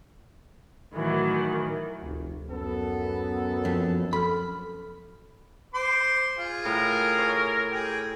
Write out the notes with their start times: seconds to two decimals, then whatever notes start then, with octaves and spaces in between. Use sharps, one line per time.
0.95 A2 D#3 E3 F#3
2.01 F1 D2
2.50 F#2 B3 A4
3.65 F2
4.13 A4 B5 F6
5.74 C5 C6 D6
6.38 F4 G#4
6.65 A2 A#4
7.19 C#5
7.71 G4 G#4